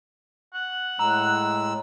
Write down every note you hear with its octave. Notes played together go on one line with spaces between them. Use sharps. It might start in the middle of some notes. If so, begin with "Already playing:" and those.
F#5
A2 G#3 A#5 E6